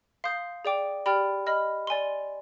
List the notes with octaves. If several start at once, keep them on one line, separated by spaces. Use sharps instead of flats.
F5 C6 D#6 G6
G#4 D5 G5 D6
G4 D5 G5 B5 F6
D#5 B5 F6
D5 G#5 C6